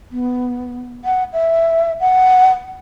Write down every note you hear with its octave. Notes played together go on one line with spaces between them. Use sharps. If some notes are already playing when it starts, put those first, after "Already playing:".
B3
F#5
E5
F#5